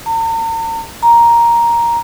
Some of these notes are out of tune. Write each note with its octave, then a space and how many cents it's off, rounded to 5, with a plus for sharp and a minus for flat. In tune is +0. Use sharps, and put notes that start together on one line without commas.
A#5 -45
A#5 +5